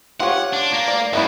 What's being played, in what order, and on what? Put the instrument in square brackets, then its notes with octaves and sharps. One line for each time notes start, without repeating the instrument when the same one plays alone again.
[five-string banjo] F4 G4 C#5 [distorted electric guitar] F#5
[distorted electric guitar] D4
A#3
[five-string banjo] D5
[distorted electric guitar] F#2 [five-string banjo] A3 B3 E4